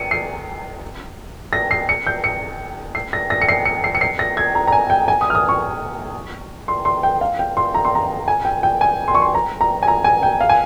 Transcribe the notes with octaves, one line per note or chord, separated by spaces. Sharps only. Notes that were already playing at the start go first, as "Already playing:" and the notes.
Already playing: C#7 D#7
C7
A#6
C7
C#7
G6
C#7
C7
A#6
A#6
C#7
C7
C#7
C7
C#7
C7
A#6
G#6
A#5
A#5
G#5
G5
G#5
D#6
F6
D#6
C#6
C6
C6
G5
F5
G5
C6
A#5
C6
A#5
G#5
G5
G5
G#5
C6
C#6
C6
A#5
A#5
G#5
A#5
G#5
G5
F5
G#5